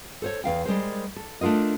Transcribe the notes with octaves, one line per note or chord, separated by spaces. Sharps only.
A4 C5 C#5
E2 F5 G5
G3 G#3 A#4 C5
A4
A3 D4 F4 A#4 D#5